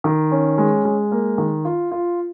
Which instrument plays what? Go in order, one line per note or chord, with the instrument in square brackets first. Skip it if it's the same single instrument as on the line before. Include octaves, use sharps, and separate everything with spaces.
[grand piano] D#3
C#4
G#3
G#3
A#3
D#3
F4
F4